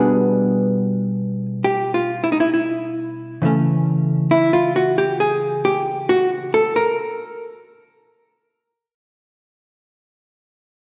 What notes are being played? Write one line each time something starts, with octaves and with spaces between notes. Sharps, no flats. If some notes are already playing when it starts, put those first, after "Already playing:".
Already playing: B2 G3 B3 D4 G#4
G4
F4
E4
D#4
E4
E4
C#3 E3 A3 C#4
E4
F4
F#4
G4
G#4
G4
F#4
A4
A#4